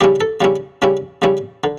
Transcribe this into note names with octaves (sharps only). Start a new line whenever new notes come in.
C#3 G3 C#4 E4 G4
A4
C#3 G3 C#4 E4
C#3 G3 C#4 E4
C#3 G3 C#4 E4
D3